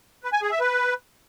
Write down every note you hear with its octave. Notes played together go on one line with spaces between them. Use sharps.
B4
G#5
G#4
E5
B4